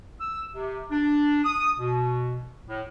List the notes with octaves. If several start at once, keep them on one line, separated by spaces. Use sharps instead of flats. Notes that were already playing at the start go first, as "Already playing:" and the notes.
E6
C3
D4
D#6
B2
A2